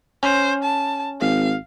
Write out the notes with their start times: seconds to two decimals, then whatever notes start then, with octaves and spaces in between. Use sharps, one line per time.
0.23 C#4 C5
0.63 A5
1.21 G#1 F5